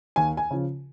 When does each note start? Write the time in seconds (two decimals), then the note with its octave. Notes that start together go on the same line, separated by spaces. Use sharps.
0.16 D#2 G#5
0.37 G#5
0.51 C#3 F3